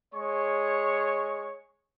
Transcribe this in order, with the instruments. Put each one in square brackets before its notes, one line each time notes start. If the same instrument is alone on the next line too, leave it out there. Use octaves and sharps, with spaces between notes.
[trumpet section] G#3 C#5 C#6